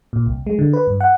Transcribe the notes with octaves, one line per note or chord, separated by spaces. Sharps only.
A#2
C2
G#3
D3
B4
G2
F#5